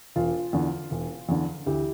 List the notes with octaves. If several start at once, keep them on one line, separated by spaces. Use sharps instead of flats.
E1 F4
E2 D3
E1
E2 D3
D2 E4 G4